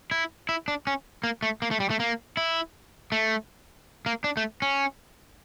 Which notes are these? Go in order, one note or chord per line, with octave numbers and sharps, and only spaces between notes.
E4
E4
D4
C#4
A#3
A3
A#3
A3
G3
A3
A#3
E4
A3
A#3
D4
A3
C#4